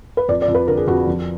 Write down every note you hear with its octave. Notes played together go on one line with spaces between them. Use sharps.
B4
F2 D5
D5
F2
B4
D3 A#4
G#4
F2 F#4
F3